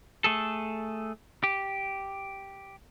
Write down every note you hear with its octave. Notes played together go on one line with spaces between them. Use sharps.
A3 G#4 A4
G4